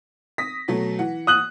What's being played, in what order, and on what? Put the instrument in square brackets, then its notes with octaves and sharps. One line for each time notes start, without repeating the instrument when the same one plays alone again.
[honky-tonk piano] D#6 A#6 B6
B2 F#3 A3
E3 F#5
[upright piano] D#6 F#6 F#7